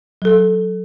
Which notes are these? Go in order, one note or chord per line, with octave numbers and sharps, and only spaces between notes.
F#3 A4